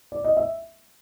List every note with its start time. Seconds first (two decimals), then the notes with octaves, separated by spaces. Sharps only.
0.12 D5
0.24 D#5
0.37 E5